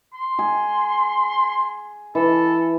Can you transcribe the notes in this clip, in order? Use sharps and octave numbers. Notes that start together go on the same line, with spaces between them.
C6
G#4
E3 A4